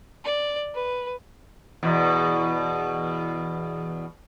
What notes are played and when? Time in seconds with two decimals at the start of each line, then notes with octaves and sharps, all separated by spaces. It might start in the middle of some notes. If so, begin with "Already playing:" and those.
0.23 D5
0.73 B4
1.83 E2 B2